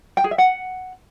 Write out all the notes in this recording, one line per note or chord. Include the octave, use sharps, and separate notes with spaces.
G5
G#4
E5
F#5